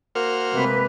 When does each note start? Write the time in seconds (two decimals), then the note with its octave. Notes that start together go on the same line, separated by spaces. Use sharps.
0.15 A#3 F#4 C5 F6
0.53 C3 G#3 B4